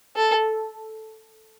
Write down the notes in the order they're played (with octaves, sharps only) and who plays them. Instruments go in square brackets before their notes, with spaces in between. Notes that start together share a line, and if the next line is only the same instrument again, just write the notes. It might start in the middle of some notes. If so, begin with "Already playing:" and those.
[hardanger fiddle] A4